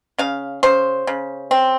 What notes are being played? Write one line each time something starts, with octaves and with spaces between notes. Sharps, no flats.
C#3 F5
C#3 C5
C#3
C4